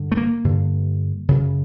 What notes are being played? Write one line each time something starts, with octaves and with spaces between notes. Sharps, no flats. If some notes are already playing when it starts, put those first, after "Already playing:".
Already playing: G2 D3
A3
A#3
G2 D3
F#2 C#3